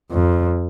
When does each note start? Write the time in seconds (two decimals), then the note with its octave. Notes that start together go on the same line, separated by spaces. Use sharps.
0.12 F2